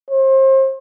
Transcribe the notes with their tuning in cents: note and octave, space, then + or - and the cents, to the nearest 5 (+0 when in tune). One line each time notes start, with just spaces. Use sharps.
C5 +35